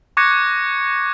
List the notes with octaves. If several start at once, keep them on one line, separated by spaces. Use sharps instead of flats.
C#6 D6 F#6 G#6 A#6 C#7